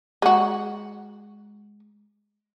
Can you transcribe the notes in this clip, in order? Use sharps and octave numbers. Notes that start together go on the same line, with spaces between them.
G#3 F#4